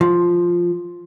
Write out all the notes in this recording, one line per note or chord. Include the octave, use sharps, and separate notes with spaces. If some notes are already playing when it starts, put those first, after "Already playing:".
F3